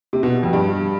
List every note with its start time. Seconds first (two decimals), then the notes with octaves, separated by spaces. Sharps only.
0.13 C3
0.23 B2
0.43 F2
0.53 G2